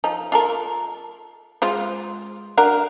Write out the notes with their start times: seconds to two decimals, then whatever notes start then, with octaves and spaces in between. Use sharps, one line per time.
0.04 F3 D#4
0.32 F4 A4 A#4
1.62 G#3 F4 C5
2.57 D4 F#4 A#4